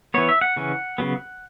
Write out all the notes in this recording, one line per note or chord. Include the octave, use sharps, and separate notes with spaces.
E3 B3 C#5
E5
F#5
C#3 E3 C#4
C#3 F#3 B3